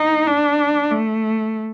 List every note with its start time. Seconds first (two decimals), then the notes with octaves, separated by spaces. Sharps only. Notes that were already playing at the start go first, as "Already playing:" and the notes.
Already playing: D#4
0.27 D4
0.91 A3